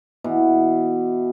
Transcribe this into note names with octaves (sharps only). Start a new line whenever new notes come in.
B2 E3